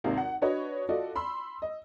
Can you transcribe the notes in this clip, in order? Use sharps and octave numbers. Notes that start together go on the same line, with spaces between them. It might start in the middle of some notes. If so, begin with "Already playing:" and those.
G#1 D#2 C3 C4 D#4 F5
F#5
D4 F#4 B4 C#5 D#5
F4 F#4 A4 D5 D#5
B5 C6 E6
D#5